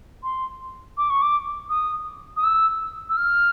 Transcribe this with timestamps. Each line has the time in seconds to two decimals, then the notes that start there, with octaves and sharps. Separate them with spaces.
0.23 C6
0.97 D6
1.10 C#6
1.22 D6
1.69 D#6
2.37 D#6
2.44 E6
3.09 E6
3.17 F6